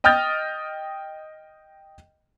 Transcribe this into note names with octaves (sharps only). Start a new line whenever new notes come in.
D#5 G5 D#6 F6 G6 A6